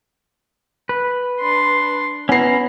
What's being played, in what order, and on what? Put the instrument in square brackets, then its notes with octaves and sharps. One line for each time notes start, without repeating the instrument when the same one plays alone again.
[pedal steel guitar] B4
[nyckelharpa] D4 C6
[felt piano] B3 C7 [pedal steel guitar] C#4 A#5 [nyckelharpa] E4